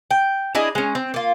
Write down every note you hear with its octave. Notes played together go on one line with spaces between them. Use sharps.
G5
D4 E4 G#4 D#5
G#3 C#4
C4
A#3 F4